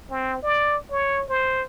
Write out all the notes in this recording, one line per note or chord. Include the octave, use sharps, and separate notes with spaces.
C4
D5
C#5
C5